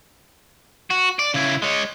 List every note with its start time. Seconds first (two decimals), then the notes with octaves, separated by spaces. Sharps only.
0.90 F#4
1.19 D5
1.34 C#3 E4
1.62 G#3 C#5